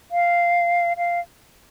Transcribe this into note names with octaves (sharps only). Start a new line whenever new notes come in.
F5
F5